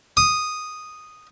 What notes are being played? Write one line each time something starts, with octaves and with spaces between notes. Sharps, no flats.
D#6